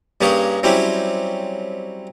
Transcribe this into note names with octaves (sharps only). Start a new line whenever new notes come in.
G2 A#3 C#4 G4 G#4 C#5
F#3 G3 C4 C#4 E4 G4